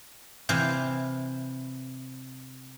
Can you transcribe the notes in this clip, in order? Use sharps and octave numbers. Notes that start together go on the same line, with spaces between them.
C3 E3 C5 F5